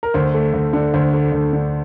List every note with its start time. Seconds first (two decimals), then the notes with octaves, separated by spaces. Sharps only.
0.03 A#4
0.14 D2 C5
0.34 A3
0.54 D2
0.73 D3
0.94 D2 C5
1.13 A3
1.32 D2
1.53 D3